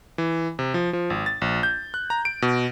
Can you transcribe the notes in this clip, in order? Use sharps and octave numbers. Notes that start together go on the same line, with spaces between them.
E3
C3
F3
F3
G#1
A6
A#1
G6
F#6
A#5
D7
B2